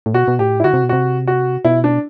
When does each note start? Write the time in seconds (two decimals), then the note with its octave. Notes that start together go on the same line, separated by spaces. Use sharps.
0.06 A2
0.14 B2 F#4
0.28 B2
0.39 A2 G4
0.60 E4
0.64 D3 F#4
0.73 C3
0.83 B2
0.89 C3 F#4
1.27 F#4
1.65 B2 E4
1.84 D4